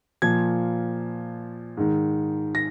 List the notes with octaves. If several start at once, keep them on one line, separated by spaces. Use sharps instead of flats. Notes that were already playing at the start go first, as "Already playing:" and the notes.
A#2 F3 G#6
G#2 D#3
A#6